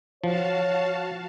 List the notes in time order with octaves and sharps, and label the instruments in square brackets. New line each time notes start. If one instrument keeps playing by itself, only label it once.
[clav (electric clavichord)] F3 [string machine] F#4 F5 A5 [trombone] C#5